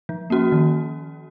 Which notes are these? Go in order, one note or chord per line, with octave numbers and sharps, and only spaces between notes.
F3
A#3 C#4 F#4
D#3